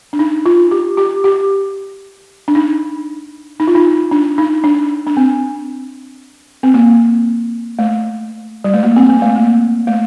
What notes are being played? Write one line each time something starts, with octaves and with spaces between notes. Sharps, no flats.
D4
D#4
F4
G4
G4
G4
D4
D#4
D#4
F4
D#4
D4
D#4
D4
D4
C4
C4
A#3
A3
G3
A3
A#3
C4
C4
A3
A#3
A3